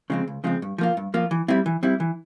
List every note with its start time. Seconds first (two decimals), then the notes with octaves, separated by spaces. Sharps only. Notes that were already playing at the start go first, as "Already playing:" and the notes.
0.10 C#3 F3 G#3 C4
0.28 C#2
0.44 C#3 F3 G#3 C4
0.62 G2
0.78 F3 A#3 F4
0.97 G2
1.14 F3 A#3 F4
1.31 E3
1.48 G3 C4 E4
1.66 E3
1.83 G3 C4 E4
2.00 E3